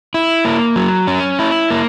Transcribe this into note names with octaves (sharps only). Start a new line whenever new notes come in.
E4
A#3
F#3
C#4
E4
A#3